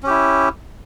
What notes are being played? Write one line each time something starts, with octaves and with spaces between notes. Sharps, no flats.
C#4 E4 G4